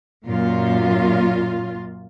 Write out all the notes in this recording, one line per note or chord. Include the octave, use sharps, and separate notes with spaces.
F#2 A#2 F4